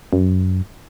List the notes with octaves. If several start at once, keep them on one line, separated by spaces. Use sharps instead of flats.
F#2